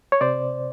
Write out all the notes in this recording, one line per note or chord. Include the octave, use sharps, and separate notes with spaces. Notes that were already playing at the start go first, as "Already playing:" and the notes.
C#5
C3 C5 D5